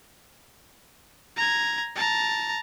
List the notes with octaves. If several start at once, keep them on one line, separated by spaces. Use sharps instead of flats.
A#5 G#6
A5 A#5